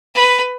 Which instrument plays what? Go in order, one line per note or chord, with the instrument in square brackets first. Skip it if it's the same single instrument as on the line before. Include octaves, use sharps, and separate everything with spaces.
[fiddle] B4